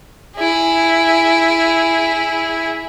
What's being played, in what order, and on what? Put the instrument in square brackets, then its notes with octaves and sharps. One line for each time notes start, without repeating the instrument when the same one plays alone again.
[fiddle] E4 G#4